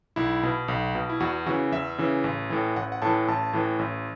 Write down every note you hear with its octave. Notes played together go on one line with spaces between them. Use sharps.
B1 E4
B2
B1
B2
E4
E2 F#4
C#3 E3 F#4
E2 E5
C#3 E3
A1
A2 E3
A1 F#5
F#5
A2 E3 A5
A1 A5
A2 E3
A1